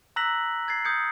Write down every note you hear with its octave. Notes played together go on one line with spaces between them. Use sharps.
A#5 E6 F#6 A#6 B6 F#7
G#6 A6 C7
D#6 G6 G#6 C#7